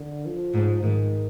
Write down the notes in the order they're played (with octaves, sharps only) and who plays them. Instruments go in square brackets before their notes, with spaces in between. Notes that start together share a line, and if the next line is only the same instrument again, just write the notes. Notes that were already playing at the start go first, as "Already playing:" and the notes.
Already playing: [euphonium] D3
F3
[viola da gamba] G#2
[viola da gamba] G#2 [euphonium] D#3